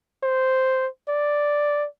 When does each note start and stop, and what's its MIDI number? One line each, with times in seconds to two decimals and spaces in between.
0.23 0.87 72
1.08 1.86 74